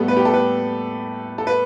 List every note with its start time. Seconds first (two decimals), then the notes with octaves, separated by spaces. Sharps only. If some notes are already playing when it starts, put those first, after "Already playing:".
Already playing: A2 G3 B3 A4
0.08 B4
0.17 G4
0.25 A4
0.34 B4
1.38 A4
1.47 B4